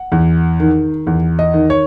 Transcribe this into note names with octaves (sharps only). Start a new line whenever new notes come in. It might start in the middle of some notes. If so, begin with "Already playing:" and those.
Already playing: F#5
E2
D#3
E2
D#5
D#3
C#5